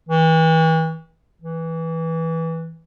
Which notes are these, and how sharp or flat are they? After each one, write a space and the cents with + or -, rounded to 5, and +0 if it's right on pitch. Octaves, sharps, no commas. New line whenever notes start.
E3 -35
E3 -10